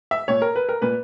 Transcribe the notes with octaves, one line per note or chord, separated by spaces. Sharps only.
E5
A#2 C#5
A#4
B4
A#4
A#2 B4